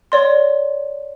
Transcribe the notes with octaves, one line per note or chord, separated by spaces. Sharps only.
C#5 D5 C6